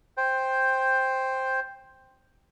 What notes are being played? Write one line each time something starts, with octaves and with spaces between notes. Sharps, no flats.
C5 G5